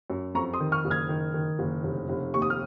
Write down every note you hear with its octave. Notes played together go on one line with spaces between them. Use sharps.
F#2
F2 A#5 C#6
C6 D#6
D#3
C#6 F6
F#1
F6 G#6
D#3
D#3
F#1
F1
F1
D#2 C#6
D#6
F6